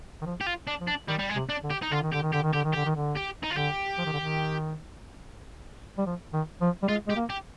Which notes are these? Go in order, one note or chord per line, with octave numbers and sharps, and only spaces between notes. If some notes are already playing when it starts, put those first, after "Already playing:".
D#3
F3
G4
F4
D4
F3
D4
D#3 G3
G3
G#3
C3
D4
D3
G4
D#4
D3 F4
D#3
D3 G4
D#3
D3 G4
D#3
D3 G4
D#3
D3 G4
D#3
D3
G4
D#4
F4
D3 G4
F3
D#3
D3
D#3
G3
F3
D#3
F3
G3
G#3 F4
G#3 G4
A#3
G4